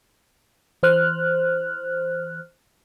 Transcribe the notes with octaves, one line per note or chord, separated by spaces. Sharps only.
E3 C5 F6 F#6